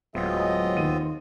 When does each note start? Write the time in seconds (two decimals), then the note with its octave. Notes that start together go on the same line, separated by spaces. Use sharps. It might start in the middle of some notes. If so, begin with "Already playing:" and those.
0.15 D1 F#3 G#3 B3 C4 F4 D#5
0.77 D#2 D#7